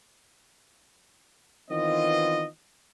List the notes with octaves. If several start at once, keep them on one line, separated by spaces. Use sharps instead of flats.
D#3 E3 B3 C4 F4 D#5